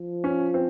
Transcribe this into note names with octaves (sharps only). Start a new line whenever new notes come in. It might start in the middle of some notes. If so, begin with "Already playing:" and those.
Already playing: F3
C#4
C4